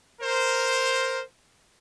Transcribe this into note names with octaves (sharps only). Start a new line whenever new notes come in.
A#4 C5